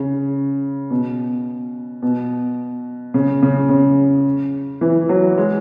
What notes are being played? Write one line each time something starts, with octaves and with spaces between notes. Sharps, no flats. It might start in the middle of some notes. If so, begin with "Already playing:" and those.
Already playing: C#3
B2
B2
C#3
C#3
C#3
E3
F#3
G#3